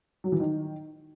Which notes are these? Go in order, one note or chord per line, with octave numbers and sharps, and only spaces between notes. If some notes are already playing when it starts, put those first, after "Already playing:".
F#3
E3
D#3